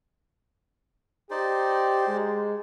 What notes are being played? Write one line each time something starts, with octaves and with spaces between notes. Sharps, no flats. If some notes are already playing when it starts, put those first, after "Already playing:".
D#4 G4 C5 D5
G#3